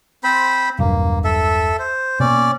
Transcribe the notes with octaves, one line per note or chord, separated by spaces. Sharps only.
C4 C5 B5
E1 B1 G2 A#3
A4 E5
C5
B2 A#3 C#4 D5